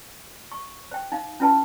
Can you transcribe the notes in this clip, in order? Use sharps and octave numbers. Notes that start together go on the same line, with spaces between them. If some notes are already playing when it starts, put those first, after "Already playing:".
C#6
C5 G5
D#4 F5
C#4 E4 F4 B4 G5 A5